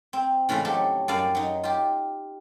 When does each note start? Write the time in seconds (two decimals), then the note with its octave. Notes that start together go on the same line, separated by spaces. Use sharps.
0.13 C4
0.49 A2 C#3 E3 G#3 F4
0.65 F#3 G4 A4
1.08 F#2 G3 D5 F5 A5
1.35 F#3 D#4
1.63 F4 G4